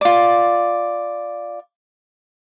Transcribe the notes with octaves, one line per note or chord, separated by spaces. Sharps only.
F4 D5